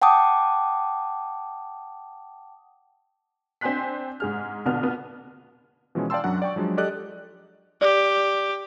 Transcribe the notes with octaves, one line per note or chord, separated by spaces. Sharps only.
F#5 G5 A5 D6 D#6
C4 D4 G#5 C6 F#6 B6
G#2 G#4 F6
A#1 B2 D3 B3 F6
B3
B2 E3 F3 G#3 C#4
D5 F5 G5 A5 C6 E6
F#2 F#3 D4 F#4 F#5
D5 G5 C#6
F3 F#3 G#3 D4
G4 A4 D5 D#5 F#6
G4 D5